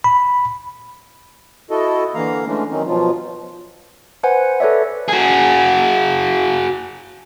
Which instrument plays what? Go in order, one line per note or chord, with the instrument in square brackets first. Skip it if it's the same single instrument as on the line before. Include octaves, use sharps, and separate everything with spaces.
[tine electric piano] B5
[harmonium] E4 F#4 A4 D#5
D3 E3 A#3 F5 A#5
D3 E3 G#3 A3 C#4 D4
D#3 F#3 C4 C#4 D#4
B2 F3 F#3 F4
[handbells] B4 C5 F#5 G#5
A4 B4 C#5 D5 E5
[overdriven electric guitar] F#4 G#4